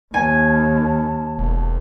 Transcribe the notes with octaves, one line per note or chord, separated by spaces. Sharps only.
D#2 G#5 A5
E1